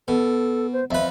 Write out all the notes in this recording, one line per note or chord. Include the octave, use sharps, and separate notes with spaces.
B2 A4
C5
F2 B4 E5